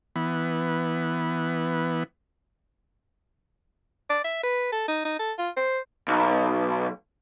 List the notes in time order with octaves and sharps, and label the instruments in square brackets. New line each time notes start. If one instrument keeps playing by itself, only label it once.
[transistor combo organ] E3 B3
[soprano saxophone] D5
E5
B4
A4
D#4
D#4
A4
F4
C5
[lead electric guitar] B1